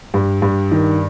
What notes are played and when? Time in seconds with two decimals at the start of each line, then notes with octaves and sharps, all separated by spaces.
0.14 G2
0.42 G2
0.71 D#3